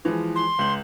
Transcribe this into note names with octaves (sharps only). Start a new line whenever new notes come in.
E3 F3 G#3
C6
C#2 G6 F#7